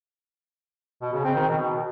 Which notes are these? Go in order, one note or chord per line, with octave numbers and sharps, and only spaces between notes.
B2
C#3
C4
D#3
B2